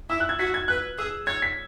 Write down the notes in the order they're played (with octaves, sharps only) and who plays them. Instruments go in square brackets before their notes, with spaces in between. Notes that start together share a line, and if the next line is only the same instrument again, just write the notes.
[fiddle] E4 [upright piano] E6
[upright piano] F#6
G#6
[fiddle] F#4 [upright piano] B6
[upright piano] G#6
[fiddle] B4 [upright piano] F#6
[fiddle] G#4 [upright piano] E6
[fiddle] C#5 [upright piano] G#6
[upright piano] B6